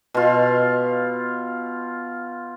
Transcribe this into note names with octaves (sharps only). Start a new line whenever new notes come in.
B2 F4